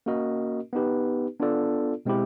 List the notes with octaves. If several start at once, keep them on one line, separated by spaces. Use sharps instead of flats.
A#3 C#4 F#4 A#4 D#5
B3 D#4 G4 B4
B3 D4 F4 A4 D5
B2 G#3 C4 E4 G4